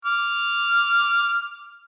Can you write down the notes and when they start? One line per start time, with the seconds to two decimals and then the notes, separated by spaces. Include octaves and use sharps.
0.05 D6 F6